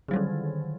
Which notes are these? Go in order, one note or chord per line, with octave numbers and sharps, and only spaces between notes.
D3 D#3 F#3 G3